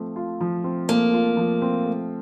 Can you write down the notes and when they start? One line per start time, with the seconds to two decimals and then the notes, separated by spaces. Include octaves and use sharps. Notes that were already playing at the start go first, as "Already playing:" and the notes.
Already playing: F3 A3 C4
0.16 F4
0.41 F3
0.64 C4
0.88 A3 A#3
1.14 F4
1.37 F3
1.62 C4
1.86 A3